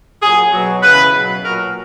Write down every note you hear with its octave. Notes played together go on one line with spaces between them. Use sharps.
A#2 F#3 G#4
B2 F#3
C#3 E3 B4
B2 F#3
A#2 F#3 A#4